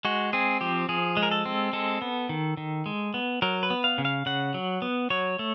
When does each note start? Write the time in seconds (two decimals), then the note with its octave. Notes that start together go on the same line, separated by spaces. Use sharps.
0.05 G#3 F#4
0.33 C4 G#4
0.61 F3 G4
0.89 F3 G#4
1.17 G#3
1.23 A#4
1.31 A4
1.46 C4
1.73 G#3 A4
2.02 B3
2.29 D#3
2.57 D#3
2.86 G#3
3.14 B3
3.42 F#3 A#4
3.63 B4
3.70 B3
3.84 F5
3.98 C#3
4.05 F5
4.26 C#3 F#5
4.54 F#3
4.82 B3
5.10 F#3 C#5
5.39 A3